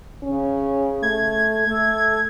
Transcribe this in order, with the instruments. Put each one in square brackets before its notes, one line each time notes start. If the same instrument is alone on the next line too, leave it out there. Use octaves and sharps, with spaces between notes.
[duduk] C#3 [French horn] C#4
[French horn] A3 [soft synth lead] G#6
[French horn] A3 [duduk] A4